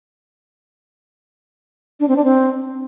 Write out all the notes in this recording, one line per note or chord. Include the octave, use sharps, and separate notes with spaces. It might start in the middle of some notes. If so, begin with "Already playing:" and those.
D4
C4
D4
C4